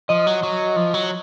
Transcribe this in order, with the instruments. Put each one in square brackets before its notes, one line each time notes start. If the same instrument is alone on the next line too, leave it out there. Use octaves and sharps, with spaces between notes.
[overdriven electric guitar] F3 [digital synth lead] D#5
[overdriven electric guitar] F#3
F#3
F3
F#3